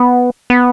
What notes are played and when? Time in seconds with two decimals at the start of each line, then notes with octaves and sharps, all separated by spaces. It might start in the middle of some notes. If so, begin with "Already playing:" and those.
Already playing: B3
0.50 B3